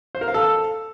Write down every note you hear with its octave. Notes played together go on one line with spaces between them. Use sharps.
C5
A#4
F5
A4